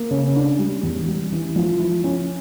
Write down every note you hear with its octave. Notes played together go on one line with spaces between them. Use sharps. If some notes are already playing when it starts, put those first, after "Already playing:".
Already playing: A#3
C#3
D4
G3
E2
G3
E3
F3
E4
C#4